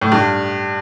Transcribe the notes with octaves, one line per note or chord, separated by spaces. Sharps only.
A2
G2